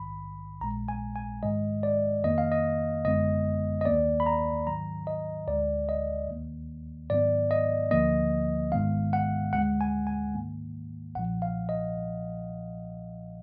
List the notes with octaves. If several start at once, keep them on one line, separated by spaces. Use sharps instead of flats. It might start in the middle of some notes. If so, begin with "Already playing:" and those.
Already playing: A#1 G#2 D#3 B5
A#1 A#2 G#3 A#5
G#5
G#5
G#2 D#3 G#3 D#5
D5
F2 D#3 A#3 D#5
F5
D#5
G#1 F#2 D3 G#3 B3 D#5
D#5
D#2 D#3 A#3 D5
B5
A#5
G#2 D#3 F#3 A#5
D#5
D2 D3 G#3 D5
D#5
D#2 D#3 A#3
G#2 D#3 F#3 B3 D5
D#5
D2 D3 F3 A#3 D#5
G#1 G#2 D#3 G#3 B3 F5
F#5
D2 D3 G#3 F#5
G#5
G#5
G#2 D#3 A#3
B1 A#2 F3 F#5
F5
D#5